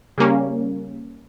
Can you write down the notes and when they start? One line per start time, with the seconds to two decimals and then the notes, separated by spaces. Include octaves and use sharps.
0.18 C#3 G3 A#3 C#4